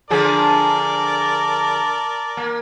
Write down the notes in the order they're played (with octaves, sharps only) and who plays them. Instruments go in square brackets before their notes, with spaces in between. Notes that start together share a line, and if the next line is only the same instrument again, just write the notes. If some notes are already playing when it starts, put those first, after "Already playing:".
[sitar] D3 F3 G#4 [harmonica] A#4 D5 A5
[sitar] A#3